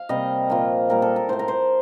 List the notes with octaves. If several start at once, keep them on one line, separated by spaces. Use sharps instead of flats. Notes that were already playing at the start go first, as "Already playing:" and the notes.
Already playing: F5
C3 G3 A#3 D#5
A#2 F3 A#3
A#2 G3 A#3 A#4
A4
A#4
A2 A3 C5
A#4
C5